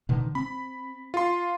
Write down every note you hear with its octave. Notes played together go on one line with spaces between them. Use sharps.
B2 D3 D#3
C4 B5
F4 C6